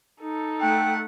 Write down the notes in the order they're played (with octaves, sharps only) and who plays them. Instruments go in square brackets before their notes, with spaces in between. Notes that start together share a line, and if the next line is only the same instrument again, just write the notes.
[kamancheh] D#4 A4
[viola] A3 F#5 [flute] G5